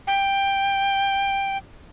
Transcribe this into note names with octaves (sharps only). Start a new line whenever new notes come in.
G5